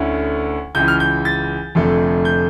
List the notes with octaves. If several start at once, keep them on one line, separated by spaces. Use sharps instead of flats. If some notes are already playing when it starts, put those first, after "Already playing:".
Already playing: D2 D3 A3 C#4 E4
C#2 C#3 E3 G6
F6
G6
A6
F1 F2 D3 A3
G6